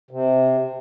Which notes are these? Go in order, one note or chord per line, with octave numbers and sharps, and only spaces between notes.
C3